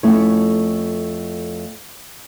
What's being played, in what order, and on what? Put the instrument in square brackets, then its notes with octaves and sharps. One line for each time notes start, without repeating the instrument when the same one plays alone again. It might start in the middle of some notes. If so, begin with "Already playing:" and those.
[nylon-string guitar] F2 A3 C#4 E4 C#5